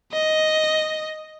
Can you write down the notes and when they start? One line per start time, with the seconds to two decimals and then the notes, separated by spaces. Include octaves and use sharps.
0.13 D#5